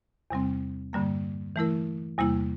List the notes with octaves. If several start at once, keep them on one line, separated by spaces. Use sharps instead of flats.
E2 C3 G3 C4
G2 D3 G3 A#3
E3 A3 E4 A#4
E2 C3 G3 A#3 E4